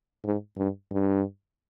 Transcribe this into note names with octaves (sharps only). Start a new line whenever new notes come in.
G#2
G2
G2